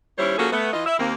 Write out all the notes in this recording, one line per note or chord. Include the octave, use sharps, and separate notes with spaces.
D#2 G3 C#4 E4 C5 C#5
F3 A#3 C#4 F#4 G#4 A4
A3 B3
E3 F4 D#5
E4 E5
D#2 A#3 C4